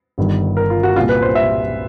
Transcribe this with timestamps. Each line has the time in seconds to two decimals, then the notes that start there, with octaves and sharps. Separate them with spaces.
0.18 G1 G2 D#3
0.57 A#4
0.70 F4
0.83 F#4
0.96 C2 A#2 F4
1.09 B4
1.22 C5
1.35 E5